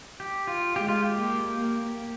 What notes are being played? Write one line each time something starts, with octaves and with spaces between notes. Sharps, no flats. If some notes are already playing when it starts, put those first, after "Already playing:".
G4
F4
G#3 G4
F4
G4
A#3
A#3